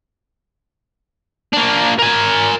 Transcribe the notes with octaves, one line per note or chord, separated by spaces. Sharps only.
A#3 D4
A#4 G#5